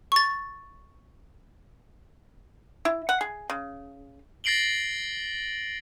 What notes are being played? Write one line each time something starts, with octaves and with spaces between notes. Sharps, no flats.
C#6 A6
E4
F#5
G#4
C#3
A6 A#6 C7 D7 F#7 G7